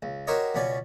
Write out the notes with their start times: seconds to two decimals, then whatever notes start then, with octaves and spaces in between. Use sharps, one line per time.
0.02 C#2
0.27 F#4 G4 A#4 C5 C#5 D#5
0.55 C#2 B2 C#4 D5 G#5